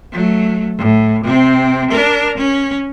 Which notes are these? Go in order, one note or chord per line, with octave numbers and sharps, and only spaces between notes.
F#3 A3
A2
C3 C4
D4 A#4
C#4